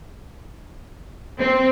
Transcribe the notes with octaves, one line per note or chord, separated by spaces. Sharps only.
C4